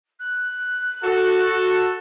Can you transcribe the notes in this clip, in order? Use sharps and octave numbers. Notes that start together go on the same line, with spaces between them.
F#6
F#4 A4